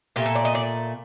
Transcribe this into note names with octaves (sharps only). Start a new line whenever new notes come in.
A#2 A3 G4
A4
D5
D#5
D5